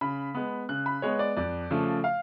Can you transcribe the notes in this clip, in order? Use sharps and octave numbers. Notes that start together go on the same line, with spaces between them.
C#3 B5
G#3 B3
C#3 F#6
B5
G#3 B3 C#5
D5
F2 D5
C#3 F3 A3
F5